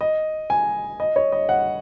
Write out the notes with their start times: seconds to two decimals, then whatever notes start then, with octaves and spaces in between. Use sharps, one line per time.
0.01 D#5
0.50 G#5
1.00 D#5
1.16 C#5
1.32 D#5
1.49 F#5